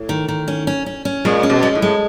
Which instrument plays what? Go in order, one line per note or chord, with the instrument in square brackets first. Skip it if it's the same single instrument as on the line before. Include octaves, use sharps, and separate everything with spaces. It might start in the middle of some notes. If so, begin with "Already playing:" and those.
Already playing: [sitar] A2
[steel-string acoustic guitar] D#3
D#3
C#4
C#4
C#4
C#4
[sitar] A#2 [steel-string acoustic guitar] G#3
[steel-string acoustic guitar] C#4
[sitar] B2
[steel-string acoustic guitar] G#3
[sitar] A2
[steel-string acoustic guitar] G#3